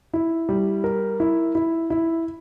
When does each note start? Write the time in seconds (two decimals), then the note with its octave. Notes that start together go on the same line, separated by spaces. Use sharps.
0.14 E4
0.49 G3
0.84 A#4
1.20 E4
1.55 E4
1.90 E4